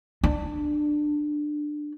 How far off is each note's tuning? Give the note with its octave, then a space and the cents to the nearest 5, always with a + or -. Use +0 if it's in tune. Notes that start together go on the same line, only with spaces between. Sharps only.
D4 +20